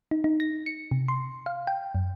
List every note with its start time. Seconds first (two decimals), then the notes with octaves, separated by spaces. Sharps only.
0.11 D#4
0.24 D#4
0.40 A#6
0.66 C#7
0.91 C3
1.08 C6
1.46 F5
1.67 G5
1.95 F#2